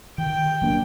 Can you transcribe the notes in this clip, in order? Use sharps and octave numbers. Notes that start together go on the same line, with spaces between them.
D#3 G5
F#3 A#3 D4